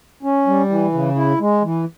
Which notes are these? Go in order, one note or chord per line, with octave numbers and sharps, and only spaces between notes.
C#4
G3
E3
C#3
E4
G#3
E3